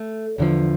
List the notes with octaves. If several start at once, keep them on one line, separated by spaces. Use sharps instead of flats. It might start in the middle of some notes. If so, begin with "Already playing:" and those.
Already playing: A3
E2 D3 F3